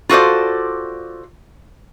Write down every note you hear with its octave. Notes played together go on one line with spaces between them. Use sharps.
F4 F#4 A4 C5 D5